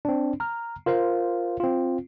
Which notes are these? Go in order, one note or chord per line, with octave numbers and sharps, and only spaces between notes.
C4 D4
A#5 F6
F4 A#4 C5 F5
C4 F4